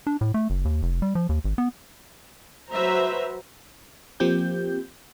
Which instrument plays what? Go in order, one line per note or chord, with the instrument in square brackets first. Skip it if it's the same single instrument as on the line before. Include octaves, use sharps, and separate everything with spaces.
[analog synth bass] D4
A2
A3
F#1
D#2
F1
G3
F3
D#2
G#1
B3
[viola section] F#3 F#4 B4 C5 E5 A#5
[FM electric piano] F3 A#3 C4 G4 G6